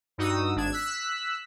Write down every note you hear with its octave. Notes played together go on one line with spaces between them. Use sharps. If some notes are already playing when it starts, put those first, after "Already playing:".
G2 D#4 F#4 D#6 E6
G#1 D4 G#6 E7
E6 F#6 B6